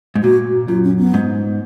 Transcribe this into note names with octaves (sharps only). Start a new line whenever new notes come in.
G#2
A#2 F#4
F#2 F4
C#4
B3
G#2